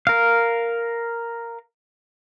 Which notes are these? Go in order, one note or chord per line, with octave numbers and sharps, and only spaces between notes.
A#4 F5